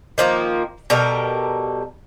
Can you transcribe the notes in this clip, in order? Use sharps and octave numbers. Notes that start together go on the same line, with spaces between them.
D#3 F3 A#3
B2 G3 A4 A#4